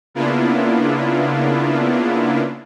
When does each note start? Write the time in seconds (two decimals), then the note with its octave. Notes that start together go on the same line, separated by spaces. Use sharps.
0.14 C#3 A#3 B3 D4 E4 F4